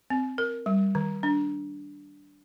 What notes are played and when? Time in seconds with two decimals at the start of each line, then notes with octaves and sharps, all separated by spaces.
0.10 C4
0.38 A#4
0.66 G3
0.95 D#3
1.23 D4